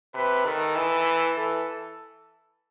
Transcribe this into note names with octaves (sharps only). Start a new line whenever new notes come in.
C3 B4
D#3 A4
E3
E3 A4